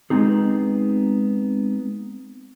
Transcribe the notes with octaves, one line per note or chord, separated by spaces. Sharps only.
G#3 B3 C4 D#4 G#4